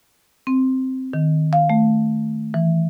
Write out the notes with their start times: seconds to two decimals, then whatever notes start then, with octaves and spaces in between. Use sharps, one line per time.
0.47 C4
1.13 D#3
1.53 F5
1.70 A3
2.54 E3